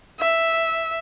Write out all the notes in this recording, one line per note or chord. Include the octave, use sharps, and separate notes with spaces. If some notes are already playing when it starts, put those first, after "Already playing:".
E5